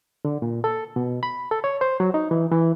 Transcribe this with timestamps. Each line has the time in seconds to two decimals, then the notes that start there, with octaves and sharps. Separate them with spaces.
0.25 D3
0.42 A#2
0.64 A4
0.96 B2
1.23 B5
1.51 A4
1.64 C#5
1.81 C5
2.00 F#3
2.14 D#4
2.31 E3
2.52 E3